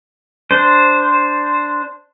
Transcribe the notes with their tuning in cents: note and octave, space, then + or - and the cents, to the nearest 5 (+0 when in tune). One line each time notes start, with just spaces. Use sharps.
D4 +0 C5 -5